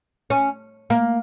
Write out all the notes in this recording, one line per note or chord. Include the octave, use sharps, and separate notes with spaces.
C#4
A#3